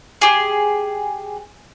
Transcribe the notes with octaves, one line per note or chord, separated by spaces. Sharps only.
G4 G#4